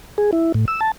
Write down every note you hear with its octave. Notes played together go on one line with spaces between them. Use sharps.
G#4
E4
A2
E6
A5